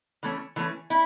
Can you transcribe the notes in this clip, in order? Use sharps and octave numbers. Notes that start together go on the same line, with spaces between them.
E3 A3 C#4
E3 A3 C#4
E4